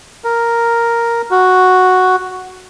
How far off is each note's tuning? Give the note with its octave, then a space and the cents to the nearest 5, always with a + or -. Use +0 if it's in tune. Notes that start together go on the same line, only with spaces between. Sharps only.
A#4 +0
F#4 +0